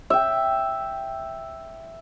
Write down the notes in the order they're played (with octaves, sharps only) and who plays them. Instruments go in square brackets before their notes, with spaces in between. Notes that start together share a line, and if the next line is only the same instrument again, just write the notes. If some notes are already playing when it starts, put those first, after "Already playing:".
[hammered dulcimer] E5 G5